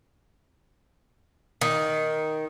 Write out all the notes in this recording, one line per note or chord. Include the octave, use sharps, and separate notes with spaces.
D#3